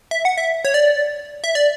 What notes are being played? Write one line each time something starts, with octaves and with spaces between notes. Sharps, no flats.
E5
F#5
E5
C#5
D5
E5
D5